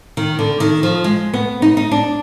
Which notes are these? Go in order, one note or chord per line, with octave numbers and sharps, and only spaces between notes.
D#3
D3
D#3
F3
G#3
B3
D#4
D#4
D4